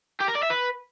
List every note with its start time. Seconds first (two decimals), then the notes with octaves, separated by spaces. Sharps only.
0.21 G4
0.28 A#4
0.36 D5
0.43 E5
0.50 B4